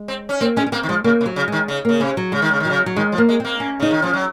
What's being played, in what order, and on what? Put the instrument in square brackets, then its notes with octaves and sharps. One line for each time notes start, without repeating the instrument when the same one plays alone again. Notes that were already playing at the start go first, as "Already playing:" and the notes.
Already playing: [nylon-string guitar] G#3
[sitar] C4
C#4
[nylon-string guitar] A#3 [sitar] C4
[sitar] G#3 [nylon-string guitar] C#4
[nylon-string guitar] C#4
[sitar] A#3 [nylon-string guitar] C4
[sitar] D#3
[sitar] F3 [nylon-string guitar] G#3
[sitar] C#3 [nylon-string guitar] A#3
[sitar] C3
[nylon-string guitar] F#3
[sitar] C#3
[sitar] D#3 [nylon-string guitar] G#3
[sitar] C#3
[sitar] C#3 [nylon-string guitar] A#3
[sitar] C3 [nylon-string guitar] C#4
[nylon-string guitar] F#3
[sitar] C#3 [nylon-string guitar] G#3
[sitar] D#3
C#3
D#3
[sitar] C#3 [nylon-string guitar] F#3
[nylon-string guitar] F#3
[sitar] D#3 [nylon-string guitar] G#3
[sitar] F3
[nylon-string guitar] A#3
[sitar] G#3
[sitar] A#3 [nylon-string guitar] C4
[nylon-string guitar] C#4
[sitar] C#3 [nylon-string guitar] D#4
[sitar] D#3
[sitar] F3 [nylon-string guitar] C#4
[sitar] F#3